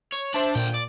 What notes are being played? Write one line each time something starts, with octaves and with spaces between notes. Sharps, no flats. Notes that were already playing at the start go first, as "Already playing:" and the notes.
C#5
D4 C5 E5 A5
A#2 D3 G5
D5